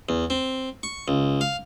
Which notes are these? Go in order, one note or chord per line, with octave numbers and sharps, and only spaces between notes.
E2
C4
C#6
C#2
F5